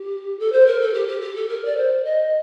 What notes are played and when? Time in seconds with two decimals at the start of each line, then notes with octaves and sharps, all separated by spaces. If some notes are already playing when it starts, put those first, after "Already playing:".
Already playing: G4
0.39 A4
0.52 C5
0.67 A#4
0.81 A4
0.94 G4
1.08 G4
1.22 G4
1.35 A4
1.49 A#4
1.65 D5
1.77 C5
2.04 D#5